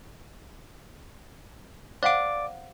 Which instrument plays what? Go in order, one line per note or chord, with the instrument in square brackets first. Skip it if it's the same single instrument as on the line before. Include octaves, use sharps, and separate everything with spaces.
[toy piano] C5 F5 F#5 [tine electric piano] D5 D6